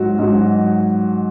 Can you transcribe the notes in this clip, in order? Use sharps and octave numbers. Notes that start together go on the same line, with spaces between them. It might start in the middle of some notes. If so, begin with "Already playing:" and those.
Already playing: G#2 F#3 F#4
G#2 F#3